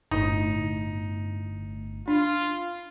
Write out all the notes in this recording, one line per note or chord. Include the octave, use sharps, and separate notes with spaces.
G1 A2 D#4
D4 F4